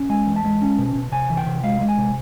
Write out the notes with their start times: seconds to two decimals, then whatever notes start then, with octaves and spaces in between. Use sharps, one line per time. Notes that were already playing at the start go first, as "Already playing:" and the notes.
Already playing: C#4
0.09 G#3 G#5
0.26 E2
0.36 A5
0.44 G#3
0.61 C#4
0.78 B2
0.95 B2
1.12 C3 G#5
1.30 E3
1.37 G5
1.46 C3
1.63 G#3 F5
1.81 G#3
1.89 G#5
1.98 C3